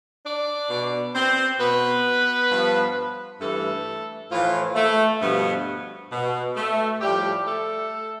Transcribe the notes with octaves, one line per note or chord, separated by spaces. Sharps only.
D4 D5
B2
C4 C5
B2 B3 B4
G2 F3
G2 E3 A3 A4
A2 E3 F3 F4
A3
G2 B2 F3 B3
B2
A3
A2 F3 G3 G4
A3 A4